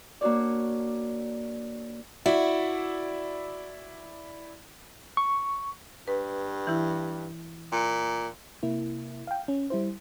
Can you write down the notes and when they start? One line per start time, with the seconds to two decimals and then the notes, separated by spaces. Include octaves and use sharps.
0.21 A#3 D4 F#4 C#5 D5
2.26 E4 F#4 D5 E5
5.17 C#6
6.08 G2 B4
6.67 E3 E4
7.72 A#2
8.63 C3 A#3 E4
9.27 F5 G5
9.48 C#4
9.70 G3 E4 C5